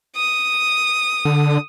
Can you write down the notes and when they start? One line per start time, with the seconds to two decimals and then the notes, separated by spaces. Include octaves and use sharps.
0.16 D#6
1.25 D3